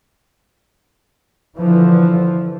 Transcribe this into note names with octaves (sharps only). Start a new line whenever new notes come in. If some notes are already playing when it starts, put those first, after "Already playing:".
D3 E3 F3